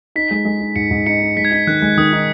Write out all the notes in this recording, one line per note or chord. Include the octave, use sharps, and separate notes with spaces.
D#4 B6
G#3
G#3
D#4
G#2 C#7
G#2
D#4 C#7
D#4
G#3 B6
G#6
D#4 B6
D#3 F#6
G#3
D#3 D#6
D#4